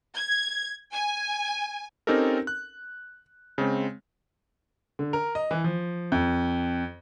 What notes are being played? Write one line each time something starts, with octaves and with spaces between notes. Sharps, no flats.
G#6
G#5
C4 C#4 D#4 G4 A4 A#4
F#6
C#3 G#3 C4
D3
A#4
D#5
E3
F3
F2